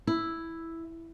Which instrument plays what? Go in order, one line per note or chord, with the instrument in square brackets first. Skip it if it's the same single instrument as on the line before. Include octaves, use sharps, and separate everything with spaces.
[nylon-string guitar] E4